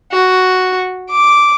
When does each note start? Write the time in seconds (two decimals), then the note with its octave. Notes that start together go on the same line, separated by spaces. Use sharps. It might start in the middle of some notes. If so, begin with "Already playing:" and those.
0.12 F#4
1.11 D6